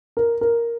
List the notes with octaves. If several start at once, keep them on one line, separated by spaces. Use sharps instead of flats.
A#4
A#4